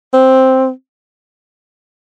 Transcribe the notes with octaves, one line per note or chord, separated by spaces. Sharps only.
C4